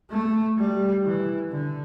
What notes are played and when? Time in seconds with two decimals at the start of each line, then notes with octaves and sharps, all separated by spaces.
0.10 A3
0.58 G3
1.04 E3
1.51 D3